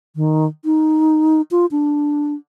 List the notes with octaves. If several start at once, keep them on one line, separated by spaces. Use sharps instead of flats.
D#3
D#4
F4
D4